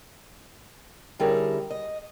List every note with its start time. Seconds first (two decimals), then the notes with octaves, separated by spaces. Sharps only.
1.19 D3 G3 C#4 E4 G#4 A#4
1.71 D#5